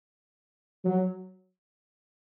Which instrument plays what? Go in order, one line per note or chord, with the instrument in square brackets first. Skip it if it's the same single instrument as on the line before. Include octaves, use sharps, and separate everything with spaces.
[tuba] F#3